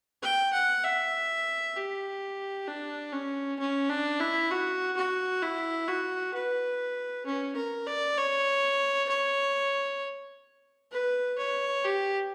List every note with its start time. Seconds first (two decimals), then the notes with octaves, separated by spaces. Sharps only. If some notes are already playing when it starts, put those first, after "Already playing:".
0.23 G5
0.53 F#5
0.84 E5
1.76 G4
2.68 D4
3.13 C#4
3.59 C#4
3.89 D4
4.20 E4
4.51 F#4
4.97 F#4
5.42 E4
5.88 F#4
6.34 B4
7.26 C#4
7.56 A#4
7.87 D5
8.18 C#5
9.09 C#5
10.92 B4
11.38 C#5
11.84 G4